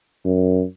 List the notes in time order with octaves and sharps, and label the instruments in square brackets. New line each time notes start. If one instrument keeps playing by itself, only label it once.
[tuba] F#2